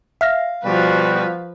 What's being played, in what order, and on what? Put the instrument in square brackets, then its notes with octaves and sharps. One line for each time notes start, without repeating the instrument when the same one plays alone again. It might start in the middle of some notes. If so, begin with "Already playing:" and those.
[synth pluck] E5 F6 A#6 [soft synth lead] F5
[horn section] B2 G3 F#4 [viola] F3 B4